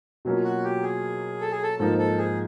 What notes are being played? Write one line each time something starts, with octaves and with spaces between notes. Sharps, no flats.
B2 F#3 A#3 C#4 F4
F#4
G4
G#4
A4
G#4
A4
G#2 F3 A#3 D#4 A4
A4
G#4